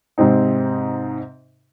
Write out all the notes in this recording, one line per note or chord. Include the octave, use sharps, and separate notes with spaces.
G#2 C3 C4 D#4